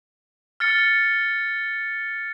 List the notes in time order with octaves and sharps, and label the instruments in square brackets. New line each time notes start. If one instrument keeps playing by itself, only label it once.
[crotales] F6 A6 C#7